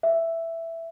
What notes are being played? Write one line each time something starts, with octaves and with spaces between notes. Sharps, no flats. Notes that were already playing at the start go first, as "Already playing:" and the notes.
E5